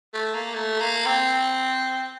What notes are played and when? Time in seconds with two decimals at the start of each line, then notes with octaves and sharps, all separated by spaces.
0.14 A3
0.34 A#3
0.54 A3
0.80 A#3
1.06 C4